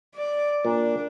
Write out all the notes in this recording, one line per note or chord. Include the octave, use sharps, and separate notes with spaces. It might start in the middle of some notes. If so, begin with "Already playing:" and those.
D5
A#2 D4